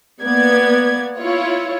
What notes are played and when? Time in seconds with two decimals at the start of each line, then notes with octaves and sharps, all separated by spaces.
0.22 A#3 B3 D5 G#6
1.17 E4 F4 C#5